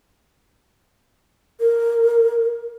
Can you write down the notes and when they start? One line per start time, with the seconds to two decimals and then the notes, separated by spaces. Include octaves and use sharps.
1.60 A#4